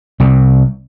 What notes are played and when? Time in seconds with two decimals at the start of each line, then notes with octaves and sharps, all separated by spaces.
0.20 C2 C3